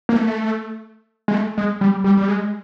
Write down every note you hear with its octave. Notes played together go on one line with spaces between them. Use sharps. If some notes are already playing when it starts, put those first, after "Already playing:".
A#3
A3
G#3
A3
G#3
G3
G3
G3
G#3